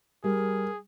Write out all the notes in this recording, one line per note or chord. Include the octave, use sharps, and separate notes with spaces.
G3 G#4 A#4